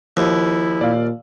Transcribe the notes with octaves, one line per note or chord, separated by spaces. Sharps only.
D#2 F3 E4
A#2 D5 F5